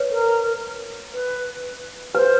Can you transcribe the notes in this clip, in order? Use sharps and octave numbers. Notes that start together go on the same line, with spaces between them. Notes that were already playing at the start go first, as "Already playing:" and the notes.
Already playing: B4 C#5
A#4
B4
B4 C5